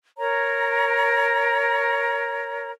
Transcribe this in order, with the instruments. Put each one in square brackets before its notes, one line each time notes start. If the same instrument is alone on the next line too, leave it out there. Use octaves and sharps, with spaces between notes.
[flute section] A#4 C#5 A#5